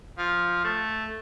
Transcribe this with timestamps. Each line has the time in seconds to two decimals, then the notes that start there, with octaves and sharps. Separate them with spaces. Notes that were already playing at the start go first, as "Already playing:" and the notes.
0.18 F3
0.64 A3